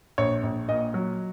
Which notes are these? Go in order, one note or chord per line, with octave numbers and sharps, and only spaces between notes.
A#1 C#5
A#1
A#2 D#5
F#3